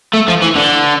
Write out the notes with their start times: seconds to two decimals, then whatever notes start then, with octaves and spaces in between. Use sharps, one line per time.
0.14 A3
0.28 F3
0.42 E3
0.56 D3